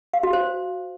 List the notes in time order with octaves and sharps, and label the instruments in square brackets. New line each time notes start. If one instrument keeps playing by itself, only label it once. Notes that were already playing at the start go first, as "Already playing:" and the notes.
[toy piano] F5
F#4
C5